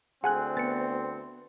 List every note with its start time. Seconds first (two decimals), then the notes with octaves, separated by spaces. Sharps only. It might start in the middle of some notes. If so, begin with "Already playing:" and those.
0.24 D2 C4 G#4 F#5 G#5 F#6
0.57 B3 A6 C#7